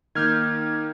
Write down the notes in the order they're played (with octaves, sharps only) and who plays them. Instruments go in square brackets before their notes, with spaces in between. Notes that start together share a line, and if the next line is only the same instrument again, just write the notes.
[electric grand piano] D#3 A#3 G6 [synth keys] F6 G#6